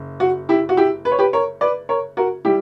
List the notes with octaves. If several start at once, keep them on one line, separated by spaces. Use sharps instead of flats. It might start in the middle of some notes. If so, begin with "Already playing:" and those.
Already playing: F#1
F#4
E4 G4
F#4
E4 G4
B4
C#5
G4 B4
A#4 C#5
B4 D5
A#4 C#5
F#4 A#4
G3 E4 G4